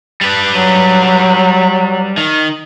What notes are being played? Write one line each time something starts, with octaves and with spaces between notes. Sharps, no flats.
G3 B4
F#3
D#3